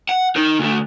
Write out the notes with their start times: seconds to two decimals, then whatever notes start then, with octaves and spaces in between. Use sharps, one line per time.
0.09 F#5
0.36 D#4 A#4
0.60 D2 A3